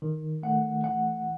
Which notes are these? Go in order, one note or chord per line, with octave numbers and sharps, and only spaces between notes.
D#3
A3 F#5
E3 F#5